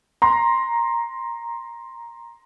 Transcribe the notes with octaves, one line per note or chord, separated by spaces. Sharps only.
A#5 C6